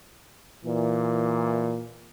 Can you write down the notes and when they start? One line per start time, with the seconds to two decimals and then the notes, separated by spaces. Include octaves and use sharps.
0.65 A#2 E3